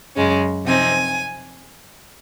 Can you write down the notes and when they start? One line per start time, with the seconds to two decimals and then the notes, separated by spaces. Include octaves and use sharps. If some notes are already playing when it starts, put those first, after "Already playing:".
0.15 F#2 C#3 G#3 C#4
0.65 C3 F3 C4 D#4 G#5